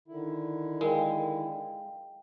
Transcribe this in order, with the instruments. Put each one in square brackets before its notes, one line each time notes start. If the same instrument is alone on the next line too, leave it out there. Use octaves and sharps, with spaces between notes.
[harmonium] D3 D#3 E4
[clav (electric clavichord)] G#3 [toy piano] A#4 [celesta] F5 G5